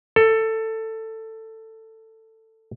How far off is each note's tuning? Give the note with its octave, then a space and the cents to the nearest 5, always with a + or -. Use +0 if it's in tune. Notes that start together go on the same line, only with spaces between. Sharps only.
A4 +15